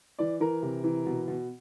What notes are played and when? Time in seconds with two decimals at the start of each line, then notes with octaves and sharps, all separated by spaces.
0.19 E3 D5
0.40 E3 A#4
0.62 C3
0.84 E3
1.06 B2
1.28 B2